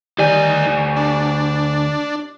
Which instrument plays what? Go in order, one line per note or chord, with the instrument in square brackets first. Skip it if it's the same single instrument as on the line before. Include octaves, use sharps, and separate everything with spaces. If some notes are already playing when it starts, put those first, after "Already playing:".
[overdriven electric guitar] D2 G#5 [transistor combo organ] D#3 [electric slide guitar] G4 D5
[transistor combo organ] D4